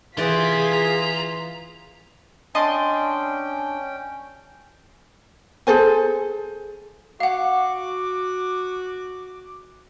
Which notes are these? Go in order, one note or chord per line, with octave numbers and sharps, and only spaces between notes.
E3 C4 F4 G4 G#4 D5 B6
D2 A#5
C#4 D4 D#5 G5 C6
G#4 A4 C5 G#5
F#4 F5 F#5 D6